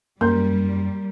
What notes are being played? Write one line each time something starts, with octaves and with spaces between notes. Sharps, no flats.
F#2 G3 A#3 A#4 C6 G6